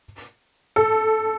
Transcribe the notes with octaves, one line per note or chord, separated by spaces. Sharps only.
A4